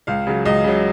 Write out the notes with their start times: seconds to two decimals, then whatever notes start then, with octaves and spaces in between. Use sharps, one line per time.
0.07 C#2 F5
0.27 C#3 F#3
0.45 C#2 D#5
0.64 C#3 F#3